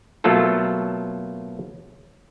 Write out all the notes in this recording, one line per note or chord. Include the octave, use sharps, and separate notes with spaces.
B2 F#3 A3 A#3 F4 A4